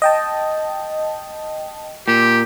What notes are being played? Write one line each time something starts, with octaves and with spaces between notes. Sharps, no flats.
D#5 G5 A5
A#2 G4